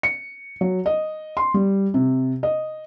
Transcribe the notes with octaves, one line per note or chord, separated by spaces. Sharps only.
C#7
F#3
D#5
C6
G3
C3
D#5